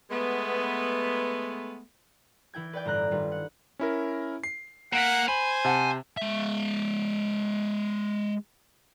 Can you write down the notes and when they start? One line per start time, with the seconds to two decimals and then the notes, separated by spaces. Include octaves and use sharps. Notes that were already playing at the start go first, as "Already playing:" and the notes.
0.10 G#3 A3 B3
2.53 E3 E4 G5 G#6
2.73 B4 D5 G5
2.85 G1 A2 A#5 F#6 A#6
3.11 D#3 G3 F4 B4
3.32 F#5
3.79 C#4 E4 A#4
4.44 C7
4.93 A#3 F#5 B6 D7 F7
5.28 C5 G#5 B5 F#7
5.65 C3 F#5 A5
6.17 G#3 E5